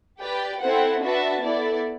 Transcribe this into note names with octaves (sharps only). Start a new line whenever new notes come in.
G4 B4 D5 G5
C4 E4 A4 C5 F#5
D4 F#4 B4 E5 A5
B3 E4 A4 D5